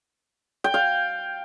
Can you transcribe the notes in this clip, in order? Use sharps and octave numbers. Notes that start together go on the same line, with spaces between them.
G5
F5